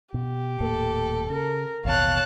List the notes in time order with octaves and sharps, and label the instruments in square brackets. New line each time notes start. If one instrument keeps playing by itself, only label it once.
[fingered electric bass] B2 [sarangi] G4
[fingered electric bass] D#1 A2 A#3 [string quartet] A4
[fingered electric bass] C#3 [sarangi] A#4
[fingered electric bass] A1 D#2 B2 [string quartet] C#5 A5 F#6 [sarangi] F5